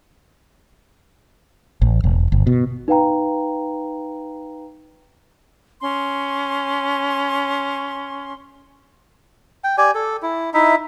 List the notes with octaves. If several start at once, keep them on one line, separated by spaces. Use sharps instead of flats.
A1
E1
G1
B2
D#4 B4 F5 G5 A#5
C#4 C6
G5
G4 D5 G#5
A4
E4
D#4 E4 E5